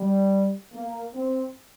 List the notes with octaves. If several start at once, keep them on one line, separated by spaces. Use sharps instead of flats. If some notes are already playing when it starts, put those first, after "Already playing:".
Already playing: G3
A#3
C4